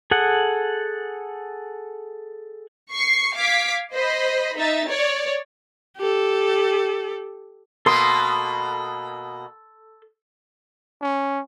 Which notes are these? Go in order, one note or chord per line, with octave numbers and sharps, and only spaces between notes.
G#4 A4 F#5
C#6 C7 C#7
F5 D6 G#6 B6
C5 D#5 B5
D#4 E5 A6
C#5 D5
G4 A4
B2 A#3 A4 C6 D#6
C#4